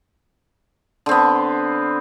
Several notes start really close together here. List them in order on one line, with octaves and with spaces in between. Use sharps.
D3 C4 B3